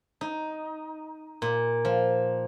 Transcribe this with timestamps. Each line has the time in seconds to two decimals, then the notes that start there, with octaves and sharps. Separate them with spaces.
0.21 D#4
1.42 A#2
1.85 F3